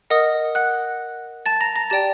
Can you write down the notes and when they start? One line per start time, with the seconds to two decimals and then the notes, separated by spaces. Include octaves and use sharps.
0.10 A#4 D#5 F#5 D#6
0.55 F#5 F#6
1.46 A5 A6
1.61 A#5 A#6
1.76 A#5 A#6
1.90 G4 D5 G5 A5 A6